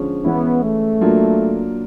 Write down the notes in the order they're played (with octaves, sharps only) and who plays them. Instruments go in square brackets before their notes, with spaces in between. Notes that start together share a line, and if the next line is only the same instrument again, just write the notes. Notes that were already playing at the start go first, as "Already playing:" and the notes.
Already playing: [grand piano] D3 F3 G#3 C#4
[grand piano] E3 G#3 C#4 E4 [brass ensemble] B3
[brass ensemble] A3
[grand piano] F#3 A#3 D4 F4